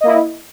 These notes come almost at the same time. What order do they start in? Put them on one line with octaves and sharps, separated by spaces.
D#5 A#3 E4